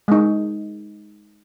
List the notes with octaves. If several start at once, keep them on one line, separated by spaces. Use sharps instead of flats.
G#3 D#4